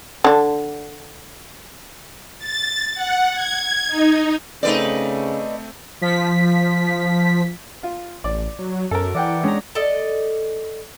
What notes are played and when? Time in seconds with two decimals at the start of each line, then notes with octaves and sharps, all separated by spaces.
0.24 D3 D4
2.39 A6
2.95 F#5
3.33 G#6
3.87 D#4
4.63 C#3 A3 C4 D#4 B4 D5
6.01 F3 B6
7.83 F4
8.24 A1 D5
8.59 F#3
8.91 F#2 A4 A#4
9.15 E3 D5 F#5 G5
9.44 G#3 C#4 D4 A#5
9.75 A4 D5 D#5